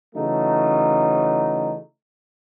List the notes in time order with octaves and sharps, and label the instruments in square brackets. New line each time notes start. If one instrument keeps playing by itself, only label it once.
[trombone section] C#3 E3 F#3 A3 D#4